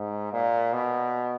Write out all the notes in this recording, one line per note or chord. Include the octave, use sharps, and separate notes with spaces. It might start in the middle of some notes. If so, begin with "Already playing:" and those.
Already playing: G#2
A#2
B2